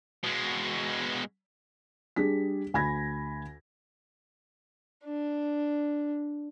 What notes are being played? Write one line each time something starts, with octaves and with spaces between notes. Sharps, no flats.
B2 G#3
G3 D4 G#4 B6
D2 G#5 B5 G#6 A#6
D4